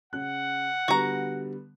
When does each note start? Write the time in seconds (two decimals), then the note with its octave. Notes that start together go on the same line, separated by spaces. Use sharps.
0.13 C#3 F#5 F#6
0.88 D3 G3 B3 F#4 A#5